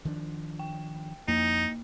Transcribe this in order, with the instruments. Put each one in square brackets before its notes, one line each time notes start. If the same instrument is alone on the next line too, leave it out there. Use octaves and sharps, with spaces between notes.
[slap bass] D#3 F3 D4
[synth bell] G5
[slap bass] F2 [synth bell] A#3 [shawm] D#4